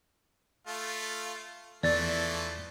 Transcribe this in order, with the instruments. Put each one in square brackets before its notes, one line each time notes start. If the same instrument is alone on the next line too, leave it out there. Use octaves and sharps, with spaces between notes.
[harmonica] A3 F4
[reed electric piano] E2 A6 [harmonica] E3 F3 A3 [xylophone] D5